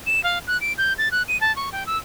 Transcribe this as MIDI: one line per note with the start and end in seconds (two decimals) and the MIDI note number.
0.07 0.23 100
0.24 0.39 77
0.47 0.60 90
0.61 0.73 98
0.78 0.93 91
0.98 1.09 93
1.12 1.23 90
1.28 1.39 99
1.41 1.54 81
1.56 1.70 85
1.72 1.86 79
1.86 1.98 88